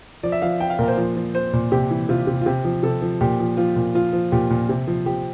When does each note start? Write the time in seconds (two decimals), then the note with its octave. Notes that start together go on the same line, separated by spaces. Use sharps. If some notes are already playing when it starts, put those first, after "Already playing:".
0.23 F3 D5
0.32 E5
0.42 F3 F5
0.60 F3 G5
0.70 F5
0.79 A#2 A#4
0.88 C5
0.97 F3
1.16 F3
1.34 F3 C5
1.53 A#2
1.72 C3 G4
1.90 E3
2.09 C3 F4
2.27 C3
2.41 F4
2.46 C3 G4
2.65 F3
2.83 C3 A4
3.02 F3
3.21 A#2 G4
3.40 F3
3.57 F3 F4
3.76 A#2
3.95 F3 F4
4.13 F3
4.32 A#2 G4
4.50 A#2
4.69 C3
4.88 F3
5.06 F3 G4